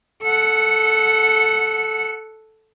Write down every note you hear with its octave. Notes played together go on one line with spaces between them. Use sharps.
A4 F#5